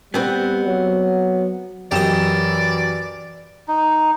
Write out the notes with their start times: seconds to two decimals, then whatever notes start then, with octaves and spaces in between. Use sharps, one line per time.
0.14 G3 B3 C4 B4
0.66 F#3
1.92 F#2 E3 G4 D5 D#5 E7
3.68 D#4